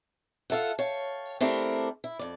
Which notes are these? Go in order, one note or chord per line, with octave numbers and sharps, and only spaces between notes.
F4 A4 E5 F#5
C#5 F5 G5 A5
A3 C4 D4 E4 G4 A#4
E4
F2 D5